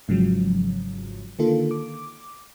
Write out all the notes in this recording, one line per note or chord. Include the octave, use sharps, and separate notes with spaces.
G#1 G#2 C#3 F3 F#3
D3 D#3 A#3 F4 A4
D6